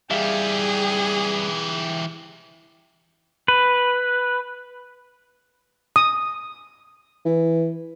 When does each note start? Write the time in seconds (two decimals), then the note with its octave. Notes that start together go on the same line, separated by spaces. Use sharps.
0.10 E3 G3 G4 G#4 E5 F5
3.48 B4
5.96 D#6
7.25 E3